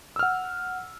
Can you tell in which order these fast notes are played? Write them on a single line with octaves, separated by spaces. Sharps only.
E6 F6 F#5